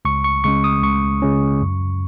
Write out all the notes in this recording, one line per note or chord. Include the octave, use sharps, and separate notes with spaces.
C#2 C#6
C#6
C#3 G#3 C#4 C#6
D#6
C#2 C#6
C#3 G#3 C#4
F#2